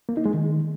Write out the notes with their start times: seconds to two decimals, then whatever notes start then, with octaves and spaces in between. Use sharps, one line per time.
0.09 A#3
0.17 D#4
0.26 G#3
0.34 D#3